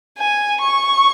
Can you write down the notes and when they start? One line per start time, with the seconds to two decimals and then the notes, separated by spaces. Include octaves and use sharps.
0.18 G#5
0.61 C#6